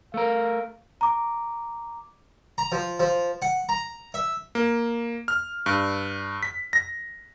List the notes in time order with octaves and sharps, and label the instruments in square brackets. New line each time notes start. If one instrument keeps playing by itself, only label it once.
[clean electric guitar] A3 A#4 [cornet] F5
[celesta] A#5 D6
[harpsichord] A#5
F3
F3
F#5
A#5
E5
[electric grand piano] A#3
F6
G2
B6
A#6